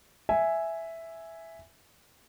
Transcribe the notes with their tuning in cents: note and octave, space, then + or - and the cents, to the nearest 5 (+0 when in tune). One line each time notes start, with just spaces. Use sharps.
E5 +0 G#5 +0